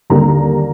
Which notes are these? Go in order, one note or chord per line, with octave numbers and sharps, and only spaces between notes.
D#2 D3 G3 A#3 A#5